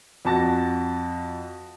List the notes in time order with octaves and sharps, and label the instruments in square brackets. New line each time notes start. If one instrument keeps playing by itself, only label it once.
[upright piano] F2 F#4 A5 A6 A#6